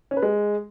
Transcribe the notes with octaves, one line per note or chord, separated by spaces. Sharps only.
C#4
B4
G#3